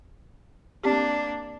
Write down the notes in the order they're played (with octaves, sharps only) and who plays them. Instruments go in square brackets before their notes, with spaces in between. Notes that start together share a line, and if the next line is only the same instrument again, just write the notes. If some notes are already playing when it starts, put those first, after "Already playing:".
[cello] A#3 D4 [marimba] C4 G4